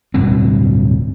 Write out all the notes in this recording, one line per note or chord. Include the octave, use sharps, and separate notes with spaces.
D1 G2 B2 C4